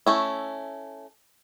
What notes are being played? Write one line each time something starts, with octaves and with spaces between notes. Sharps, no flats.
A3 C#4 E4